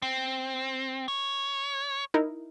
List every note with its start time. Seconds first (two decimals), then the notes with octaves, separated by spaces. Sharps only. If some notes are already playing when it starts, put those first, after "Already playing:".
0.02 C4
1.08 C#5
2.14 D#4 E4 A#4